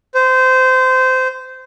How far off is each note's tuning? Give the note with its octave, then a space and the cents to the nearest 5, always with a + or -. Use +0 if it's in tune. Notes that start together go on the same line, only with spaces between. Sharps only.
C5 -20